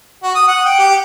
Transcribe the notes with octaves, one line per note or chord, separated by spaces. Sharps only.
F#4
D#6
F#5
G5
G4